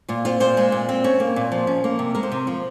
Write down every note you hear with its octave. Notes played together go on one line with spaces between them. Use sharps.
A#2 F4
C4 F4
A#2 C5
G#3
A#2
C4
C#4 C#5
A#3
A#2
F3
C#4
A#3
C3
G#3 A#4
C5
C3
F3